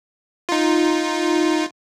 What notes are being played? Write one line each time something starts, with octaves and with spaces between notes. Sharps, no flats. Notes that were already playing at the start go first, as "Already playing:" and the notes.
D#4 F4